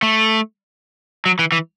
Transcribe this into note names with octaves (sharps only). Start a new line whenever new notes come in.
A3
F#3
E3
E3